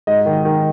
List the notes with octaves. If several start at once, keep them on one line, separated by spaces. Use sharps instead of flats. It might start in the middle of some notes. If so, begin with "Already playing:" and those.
G#2 D#5
D#3
D#3